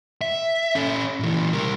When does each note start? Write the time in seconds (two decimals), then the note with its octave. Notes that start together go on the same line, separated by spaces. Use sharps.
0.21 E5
0.75 C#4 A4
1.20 A#2 E3
1.53 C2 A#4